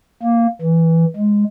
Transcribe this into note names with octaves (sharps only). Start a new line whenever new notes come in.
A#3
E3
G#3